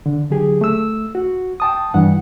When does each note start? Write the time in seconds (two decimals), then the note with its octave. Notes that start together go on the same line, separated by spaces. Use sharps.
0.06 D3
0.31 D3 F#3 G4 G#4
0.61 A3 E6
1.15 F#4
1.60 G5 A5 D#6
1.94 G2 E3 G3 F#5